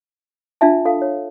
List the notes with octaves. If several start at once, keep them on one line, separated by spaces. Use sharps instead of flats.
D4 F4 E5 A5
F4 A4 F5
C#5